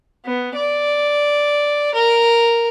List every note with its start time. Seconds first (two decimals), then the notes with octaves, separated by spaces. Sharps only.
0.25 B3
0.55 D5
1.95 A#4